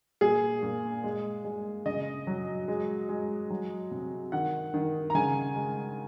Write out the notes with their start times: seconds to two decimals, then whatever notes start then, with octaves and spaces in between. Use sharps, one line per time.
0.21 A#2 G#4
0.63 A#2
1.04 G#3
1.45 G#3
1.86 C#3 D#5
2.27 F#3
2.68 G#3
3.09 G#3
3.50 F#3
3.91 C3
4.32 D#3 F#5
4.74 D#3
5.10 A#5
5.15 C#3 G#5
5.56 G#3